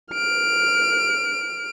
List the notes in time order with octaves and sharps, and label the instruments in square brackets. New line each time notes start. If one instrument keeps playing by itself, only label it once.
[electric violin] F6 D7